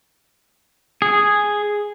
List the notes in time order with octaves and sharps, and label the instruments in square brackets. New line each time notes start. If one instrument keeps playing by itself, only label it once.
[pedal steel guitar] G#4